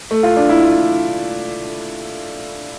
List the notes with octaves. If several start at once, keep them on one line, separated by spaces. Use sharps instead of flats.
A3
F4
D4
E4
F4